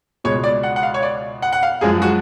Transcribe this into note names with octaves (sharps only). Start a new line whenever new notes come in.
C#2 B2 G#3 C#5
D5
F#5
F#5
F5
C#5
D5
F#5
F#5
F5
F#2 F3 G#3 G#4
F#4